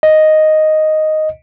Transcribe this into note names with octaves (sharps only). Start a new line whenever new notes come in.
D#5